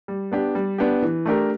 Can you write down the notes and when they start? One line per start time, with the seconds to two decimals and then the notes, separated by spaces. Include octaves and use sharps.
0.08 G3
0.32 B3 D4 G4
0.55 G3
0.78 B3 D4 G4
1.02 E3
1.25 A3 D4 G4 A#4